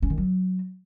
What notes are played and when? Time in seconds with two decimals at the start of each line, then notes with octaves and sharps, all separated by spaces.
0.02 C#4
0.10 D#3
0.18 F#3